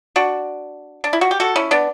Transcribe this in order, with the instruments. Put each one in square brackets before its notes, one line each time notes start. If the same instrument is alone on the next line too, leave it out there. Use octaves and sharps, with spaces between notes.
[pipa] D4 F#4
D4
E4
F#4
G4
F#4 A4
C#4 E4
B3 D4